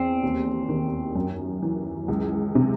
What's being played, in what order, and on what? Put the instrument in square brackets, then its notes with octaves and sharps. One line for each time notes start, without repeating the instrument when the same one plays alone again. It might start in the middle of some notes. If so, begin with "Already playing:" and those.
Already playing: [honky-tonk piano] E2 [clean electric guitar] C4
[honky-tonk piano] D#2
D#3
F#2
E3
C#2
C3